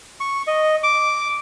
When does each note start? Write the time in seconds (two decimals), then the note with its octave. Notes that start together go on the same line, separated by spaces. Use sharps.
0.20 C#6
0.47 D#5
0.83 D6